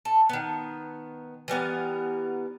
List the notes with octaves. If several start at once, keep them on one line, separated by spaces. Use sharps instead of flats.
A4
D#3 B3
E3 G3 B3 A#4